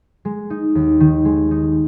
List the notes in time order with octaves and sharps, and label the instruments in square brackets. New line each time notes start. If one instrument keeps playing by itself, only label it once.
[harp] G#3
D#4
D#2
D#3
G#3
D#4